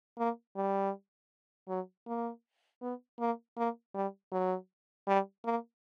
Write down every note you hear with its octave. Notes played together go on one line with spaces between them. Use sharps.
A#3
G3
F#3
A#3
B3
A#3
A#3
G3
F#3
G3
A#3